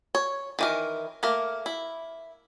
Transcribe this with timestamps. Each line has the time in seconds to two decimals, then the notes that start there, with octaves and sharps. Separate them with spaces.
0.15 C#5
0.59 D#3 E3 A#4
1.23 A3 A#3 A#4
1.66 E4